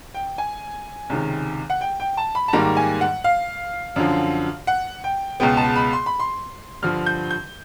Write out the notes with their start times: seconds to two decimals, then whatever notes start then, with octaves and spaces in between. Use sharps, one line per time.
0.14 G5
0.38 G#5
1.10 C#2 C3 D#3
1.70 F#5
1.81 G5
2.00 G5
2.17 A5
2.35 B5
2.48 A5
2.53 G#2 D#3 G3 A#3 A#5
2.77 G#5
3.01 F#5
3.24 F5
3.96 F#2 D3 F3
4.67 F#5
5.04 G5
5.40 C#2 B2 G#3 B3 G5
5.57 A5
5.76 B5
5.93 C6
6.06 B5
6.19 C6
6.82 G2 D3 F3 F6
7.06 G6
7.30 G6